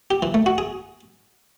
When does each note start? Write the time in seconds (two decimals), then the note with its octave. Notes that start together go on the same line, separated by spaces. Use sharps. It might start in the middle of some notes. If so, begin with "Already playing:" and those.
0.11 G4
0.22 E3
0.34 A3
0.46 F#4
0.58 G#4